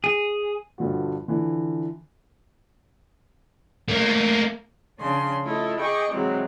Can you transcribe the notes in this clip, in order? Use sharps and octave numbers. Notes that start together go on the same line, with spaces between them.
G#4
G2 B2 D3 F3 F#4
D3 E3 F3
A3 A#3
C#3 F3 C#4 D4 C6
A3 E4 F4 A4 D#5
G#4 D#5 G5 C#6 D6
C3 E3 F#3 G#3 C4